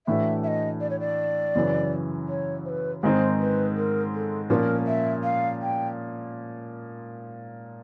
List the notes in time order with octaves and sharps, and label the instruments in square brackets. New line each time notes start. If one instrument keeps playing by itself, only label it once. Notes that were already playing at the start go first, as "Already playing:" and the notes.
[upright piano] A2 E3 A3 D4 F#4 [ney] E5
[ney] E5
D#5
D5
C#5
D5
[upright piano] F#2 C#3 E3
[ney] C#5
C5
B4
[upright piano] G#2 D#3 G#3 C4 D#4 [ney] C5
[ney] B4
A#4
A4
[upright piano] A#2 F3 A#3 C#4 [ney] A#4 B4
[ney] E5
F5
G5